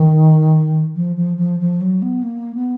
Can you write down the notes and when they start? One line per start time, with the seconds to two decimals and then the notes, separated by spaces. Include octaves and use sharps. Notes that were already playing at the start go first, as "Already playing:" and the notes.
Already playing: D#3
0.96 F3
1.16 F3
1.37 F3
1.60 F3
1.81 F#3
2.02 B3
2.23 A#3
2.55 B3